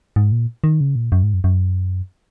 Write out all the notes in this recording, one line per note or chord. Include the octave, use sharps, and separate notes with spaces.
G#2
A#2
D#3
C#3
A#2
F#2
G#2
F#2
F#2